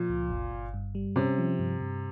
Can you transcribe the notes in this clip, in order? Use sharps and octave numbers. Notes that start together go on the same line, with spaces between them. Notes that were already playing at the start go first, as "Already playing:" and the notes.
Already playing: A#2 F3
C#2
G1
G1
G2
G3
C3 C#4
F3
G2
G2